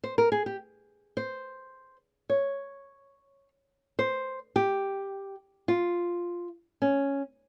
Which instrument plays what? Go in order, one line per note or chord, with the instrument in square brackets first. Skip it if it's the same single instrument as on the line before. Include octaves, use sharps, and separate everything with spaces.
[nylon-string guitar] C5
A#4
G#4
G4
C5
C#5
C5
G4
F4
C#4